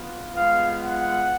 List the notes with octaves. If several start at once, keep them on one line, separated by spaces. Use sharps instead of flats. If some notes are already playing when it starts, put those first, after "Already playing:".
Already playing: B3 F4
G#3 B3 F4 F5
F#5